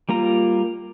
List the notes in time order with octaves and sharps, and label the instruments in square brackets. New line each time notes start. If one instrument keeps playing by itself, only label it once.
[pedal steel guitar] G3 A#3 F4 A#5